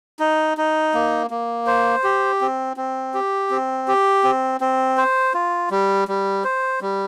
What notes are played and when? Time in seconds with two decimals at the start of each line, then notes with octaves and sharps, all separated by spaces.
0.20 D#4
0.57 D#4
0.94 A#3
1.30 A#3
1.67 C5
2.04 G4
2.41 C4
2.77 C4
3.14 G4
3.50 C4
3.88 G4
4.24 C4
4.61 C4
4.97 C5
5.34 F4
5.71 G3
6.08 G3
6.44 C5
6.81 G3